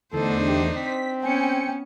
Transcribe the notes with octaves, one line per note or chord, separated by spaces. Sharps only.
E2 D3 A3 D4 D#4 A4 C5
G4
C4 B6
B3 C#4 G5 G#5 C#7